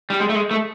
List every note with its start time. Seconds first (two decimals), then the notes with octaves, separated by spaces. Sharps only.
0.10 G3
0.20 G#3
0.29 A3
0.35 G#3
0.51 A3